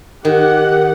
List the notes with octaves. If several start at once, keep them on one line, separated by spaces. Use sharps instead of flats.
D#3 G4 F#5